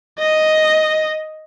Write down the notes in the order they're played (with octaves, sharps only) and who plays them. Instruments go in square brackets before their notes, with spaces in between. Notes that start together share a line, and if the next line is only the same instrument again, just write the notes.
[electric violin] D#5